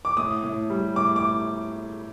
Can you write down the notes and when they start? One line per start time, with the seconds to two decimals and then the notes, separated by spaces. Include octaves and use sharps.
0.05 D6
0.17 A2 D#6
0.43 A2
0.70 G3
0.96 A2 D6
1.16 D6